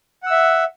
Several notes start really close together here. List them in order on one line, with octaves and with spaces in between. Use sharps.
F#5 E6 E5